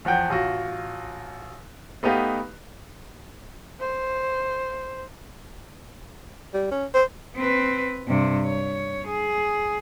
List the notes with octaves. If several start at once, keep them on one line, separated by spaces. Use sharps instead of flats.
E2 F3 F#5 G5 G6
A1 F4 F#4
A3 B3 D#4 G4 B4 F5
C5
G3
C#4
C5
C4 B4
G2 C3
C#5
G#4